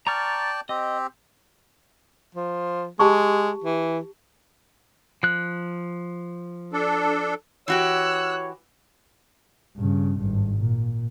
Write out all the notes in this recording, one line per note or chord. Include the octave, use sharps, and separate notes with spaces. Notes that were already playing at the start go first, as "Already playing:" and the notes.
D5 G5 A5 A#5 C#6 F6
C4 G4 D#5
F3
G#3 G4 A5 C#6
E3
F3 F#6
D4 A4
E3 F#4 G4 C#5 E6 F#6
G2 C#3
G#1 G2
A#2